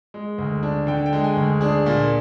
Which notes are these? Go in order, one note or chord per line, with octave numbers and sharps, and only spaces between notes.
G#3
D2
D4
D3 G5
G5
G#3
G#5
D2
D4 G#4
A#2